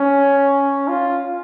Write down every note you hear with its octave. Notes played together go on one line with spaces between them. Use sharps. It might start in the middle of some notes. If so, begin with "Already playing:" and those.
Already playing: C#4
F4